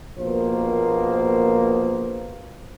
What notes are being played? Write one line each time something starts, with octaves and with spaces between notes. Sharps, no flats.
A#1 B2 A#3 C5